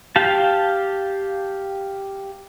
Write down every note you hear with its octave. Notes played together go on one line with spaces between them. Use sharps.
G4 F5 A5